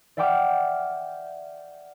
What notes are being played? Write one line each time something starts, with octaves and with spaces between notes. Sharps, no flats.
D5 E5 F#5 G5 D6 F6